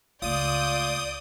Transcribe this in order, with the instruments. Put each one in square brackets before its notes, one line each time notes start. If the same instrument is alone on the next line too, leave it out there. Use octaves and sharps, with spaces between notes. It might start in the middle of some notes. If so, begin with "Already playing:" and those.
[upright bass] C#2 A3 [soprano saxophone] F4 [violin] D5 G6 [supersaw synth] D#6